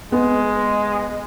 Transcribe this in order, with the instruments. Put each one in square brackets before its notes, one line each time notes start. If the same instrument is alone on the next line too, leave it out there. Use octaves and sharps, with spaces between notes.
[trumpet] G#3 [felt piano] B3